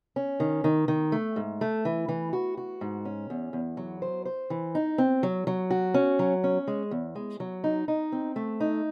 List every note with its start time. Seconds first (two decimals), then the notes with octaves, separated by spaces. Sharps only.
0.16 C#4
0.40 D#3
0.64 D#3
0.88 D#3
1.12 A3
1.36 G#2
1.61 A3
1.85 E3
2.08 E3
2.33 F#4
2.57 F#4
2.81 G#2
3.05 C#4
3.30 E2
3.53 E2
3.77 F#3
4.02 C5
4.25 C5
4.50 E3
4.75 D#4
4.98 C4
5.23 F#3
5.47 F#3
5.70 F#4
5.94 C#4
6.19 F#3
6.44 C#4
6.67 G#3
6.91 E2
7.15 G#3
7.40 F#3
7.64 D#4
7.88 D#4
8.12 C4
8.36 A3
8.60 D#4